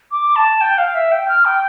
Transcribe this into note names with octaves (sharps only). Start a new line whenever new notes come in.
D6
A5
G5
F5
E5
G5
F6
G5